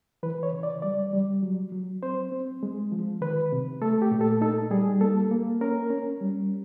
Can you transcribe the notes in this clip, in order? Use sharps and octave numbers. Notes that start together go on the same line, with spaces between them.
E3 B4
C#5
C#3
D5
G3 D5
G3
F#3
F#3
C4 C5
C4
G#3
F3
D#3 B4
C3
A3 A4
G4
A#2
A4
D#4 A4
G3 G#4
A#3 A4
A#3
C#4 A#4
C#4
G3